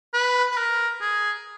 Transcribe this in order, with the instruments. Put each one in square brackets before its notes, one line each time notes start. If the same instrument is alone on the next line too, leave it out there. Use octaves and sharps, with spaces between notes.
[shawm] B4
B4
A#4
G#4